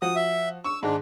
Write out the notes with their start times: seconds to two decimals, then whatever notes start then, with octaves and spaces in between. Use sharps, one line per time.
0.02 F3 F#4 D#6
0.16 E5
0.64 C#6 E6
0.83 G#2 D#3 G#3 D4